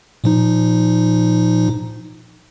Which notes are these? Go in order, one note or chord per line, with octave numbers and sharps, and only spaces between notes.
A#2 F3 D#4